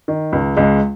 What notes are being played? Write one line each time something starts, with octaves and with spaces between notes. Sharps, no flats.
D#3
C#2
C#2 G#3